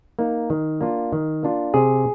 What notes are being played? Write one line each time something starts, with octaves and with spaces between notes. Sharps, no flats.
A#3 D#4
D#3
A#3 D4 F4
D#3
A#3 D4 F4
C3 G#4